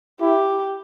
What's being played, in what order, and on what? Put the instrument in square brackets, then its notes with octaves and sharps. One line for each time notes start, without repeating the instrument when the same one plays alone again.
[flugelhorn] E4 [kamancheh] G4